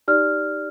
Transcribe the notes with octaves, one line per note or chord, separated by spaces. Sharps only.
D#4 G4 D5 F6